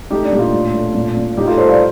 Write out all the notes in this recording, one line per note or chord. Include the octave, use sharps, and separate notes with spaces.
A3 D#4 G4
D4
A#2 G4
D4 F4
A2
A3
A#2
A#2
A2 D#4 G4
F4 A4
G3 A4 C5
D5 F5